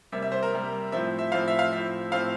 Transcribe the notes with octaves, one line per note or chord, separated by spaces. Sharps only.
C3 G3 A#3 E5
E5
C5
A#4
C3 G3 A#3
A2 F3 C4 E5
E5
A2 F3 C4 F5
E5
F5
A2 F3 C4 E5
A2 F3 C4 F5